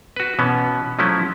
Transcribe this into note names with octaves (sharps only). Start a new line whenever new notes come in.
F#4 B4
B2 E3 B3 C#4
F3 F#3 A3 C#4 E4